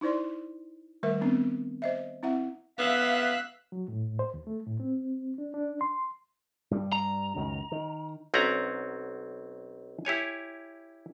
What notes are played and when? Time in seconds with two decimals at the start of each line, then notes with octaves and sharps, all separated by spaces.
0.01 D#4 E4 C5 D5 C6
1.03 D#3 G3 A3 A#4 E5
1.21 B3 C4 D4
1.82 C5 D#5 E5
2.23 C4 E4 E5 F#5
2.79 B3 E5 F5 E6 F#6
3.72 F#3
3.88 A2
4.19 C5
4.34 D#2
4.47 A3
4.67 A2
4.80 C4
5.38 D4
5.54 D4
5.81 C6
6.71 G2 G3
6.93 A#5
7.36 C#2 F#2 D#3
7.72 D#3
8.34 B1 C4 C#4 F#4 F#5 A#5
10.05 E4 G4 C#5 G#5